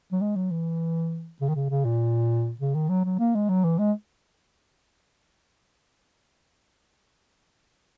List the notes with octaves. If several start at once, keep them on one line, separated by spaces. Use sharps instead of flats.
F#3
G#3
F#3
E3
C#3
D#3
C#3
C#3
A#2
C#3
D#3
F#3
F#3
A#3
G#3
F#3
E3
G#3